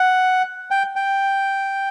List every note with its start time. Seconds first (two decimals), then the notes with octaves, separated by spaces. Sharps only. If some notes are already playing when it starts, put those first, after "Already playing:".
Already playing: F#5
0.71 G5
0.96 G5